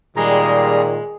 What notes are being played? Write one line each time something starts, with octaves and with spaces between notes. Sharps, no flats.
A#2 D#3 G3 G#3 G#4 A#5